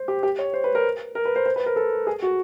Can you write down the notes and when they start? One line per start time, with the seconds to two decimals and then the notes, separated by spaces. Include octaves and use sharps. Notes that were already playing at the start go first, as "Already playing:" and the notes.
Already playing: C5
0.08 G4
0.23 G4
0.39 C#5
0.54 C5
0.64 B4
0.75 A#4
1.15 A#4
1.25 B4
1.36 C5
1.46 C5
1.56 B4
1.66 A#4
1.76 A4
2.07 G#4
2.22 F#4